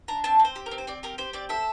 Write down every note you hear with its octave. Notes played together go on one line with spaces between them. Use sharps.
D4 A#5
C4 A5
C4
C5
G4
A#4
C4
C5
C4 D5
G4 A#4
G4 C5
C4 D5
A4 E5